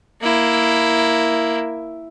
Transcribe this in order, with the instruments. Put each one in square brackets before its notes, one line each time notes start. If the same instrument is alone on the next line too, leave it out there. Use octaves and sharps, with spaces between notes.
[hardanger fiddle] A#3 E4